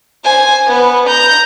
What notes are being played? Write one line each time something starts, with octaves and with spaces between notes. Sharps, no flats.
C5 G#5
B3 B4
A#5 G6